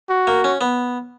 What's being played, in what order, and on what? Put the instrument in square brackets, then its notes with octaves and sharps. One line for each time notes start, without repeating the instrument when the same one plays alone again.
[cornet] F#4
[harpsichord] A#3
C#4
B3